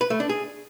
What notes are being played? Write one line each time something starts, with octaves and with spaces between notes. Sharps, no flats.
B4
A3
D4
G#4